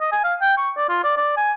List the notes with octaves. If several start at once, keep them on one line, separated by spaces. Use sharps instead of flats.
D#5
G#5
F5
G5
C#6
D5
F4
D5
D5
G#5